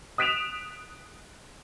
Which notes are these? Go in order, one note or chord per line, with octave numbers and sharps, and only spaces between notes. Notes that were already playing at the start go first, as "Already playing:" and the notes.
D#6 F#6 B6 D7 E7 F7